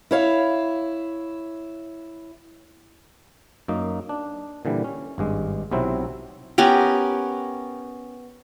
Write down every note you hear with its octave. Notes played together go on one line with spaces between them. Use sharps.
E4 C#5 F5
F#2 A#3 D#4
D4
A#2 D3 E3 G3
C#4
G#1 G2 G#3
B1 C3 F#3 C4 E4
B3 C#4 G4 A#4